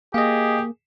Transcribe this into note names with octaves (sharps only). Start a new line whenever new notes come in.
A#3 G4 G#4 D#5 F5